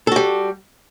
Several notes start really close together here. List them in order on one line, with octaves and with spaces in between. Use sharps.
A4 F#4 G3